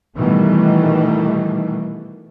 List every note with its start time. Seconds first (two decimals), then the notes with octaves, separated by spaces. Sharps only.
0.17 B2 D#3 E3 G3 A3